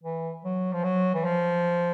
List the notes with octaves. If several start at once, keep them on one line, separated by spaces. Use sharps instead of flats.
E3
F#3
F3
F#3
E3
F3